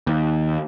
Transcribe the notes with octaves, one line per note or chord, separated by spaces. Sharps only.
D#2